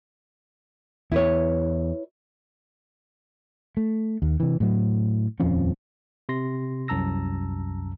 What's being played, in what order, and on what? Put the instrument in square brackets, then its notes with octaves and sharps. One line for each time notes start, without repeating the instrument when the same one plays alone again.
[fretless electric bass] E2 [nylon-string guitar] E4 B4 C#5
[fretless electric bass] A3
D#2
C3 E3
A2 F#3
D#1 F2 F3 C#4
[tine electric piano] C3 C6 A#6
C2 F#2 A5 A#5 E6 A#6